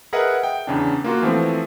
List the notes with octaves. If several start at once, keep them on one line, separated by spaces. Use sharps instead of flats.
G#4 A#4 B4 D#5 E5 F#5
G5
E2 C#3 D4
A#3 F4 F#4
E3 F3 A3 C4